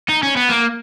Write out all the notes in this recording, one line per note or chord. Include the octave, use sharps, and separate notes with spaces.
D#4
C#4
B3
A#3